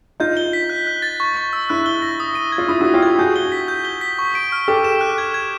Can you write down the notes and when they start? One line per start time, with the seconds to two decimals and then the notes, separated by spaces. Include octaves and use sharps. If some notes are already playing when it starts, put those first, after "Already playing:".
0.20 D#4 F4 G6
0.37 G7
0.53 B6
0.69 F#6
0.87 F#6
1.02 A6
1.20 C#6
1.37 C#6
1.53 E6
1.70 E4 F#6
1.86 G7
2.02 A#6
2.20 D#6
2.35 D#7
2.52 G#6
2.58 F4
2.69 E4 D#6
2.81 E4 F#4 D#6
2.94 F4 G4
3.02 G#6
3.19 F#4 G#4 G6
3.36 G7
3.52 B6
3.68 G6
3.85 G7
4.01 B6
4.19 C#6
4.35 D7
4.52 F6
4.68 G4 A4 D6
4.84 E7
5.01 F#6
5.18 G#6
5.34 G#6